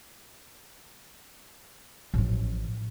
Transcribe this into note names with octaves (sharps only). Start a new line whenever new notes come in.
A1 F3